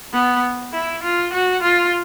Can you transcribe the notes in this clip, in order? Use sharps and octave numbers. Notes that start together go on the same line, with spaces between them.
B3
E4
F4
F#4
F4